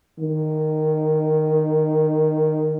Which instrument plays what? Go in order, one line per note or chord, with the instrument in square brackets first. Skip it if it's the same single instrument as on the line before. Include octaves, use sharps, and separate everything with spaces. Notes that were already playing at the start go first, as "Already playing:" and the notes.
[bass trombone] D#3